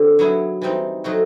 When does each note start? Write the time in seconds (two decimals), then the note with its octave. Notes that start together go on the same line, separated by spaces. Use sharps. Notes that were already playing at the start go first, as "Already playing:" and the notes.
Already playing: D3 C4
0.19 F#3 B3 E4 G#4
0.62 E3 G3 C4 D#4
1.04 F#3 A3 C4 D#4 F#4